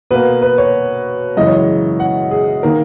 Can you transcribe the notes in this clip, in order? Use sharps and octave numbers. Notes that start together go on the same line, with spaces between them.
B2 A#3 B4
B4
C#5
F#2 C#3 E3 G#3 D#5
C#5
D#5
F#5
G#4
D#3 A#3 A#4